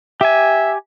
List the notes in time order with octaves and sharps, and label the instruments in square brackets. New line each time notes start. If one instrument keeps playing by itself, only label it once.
[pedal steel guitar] G4 G#5 [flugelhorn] E5